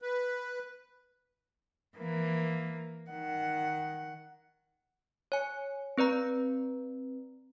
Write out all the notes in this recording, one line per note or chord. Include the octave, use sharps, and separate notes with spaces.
B4
E3 A#3
D#3 F#5
C#5 G#5
C4 B4 D5 A#5